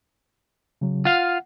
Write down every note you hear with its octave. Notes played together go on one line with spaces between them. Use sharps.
C#3 F#3
F4 F5 F#5